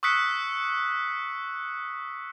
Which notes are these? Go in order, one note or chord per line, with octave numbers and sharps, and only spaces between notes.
C#6 D#6 E6 F#6 B6 C#7